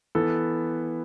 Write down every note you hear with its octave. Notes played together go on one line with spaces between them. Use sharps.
E3 B3 A4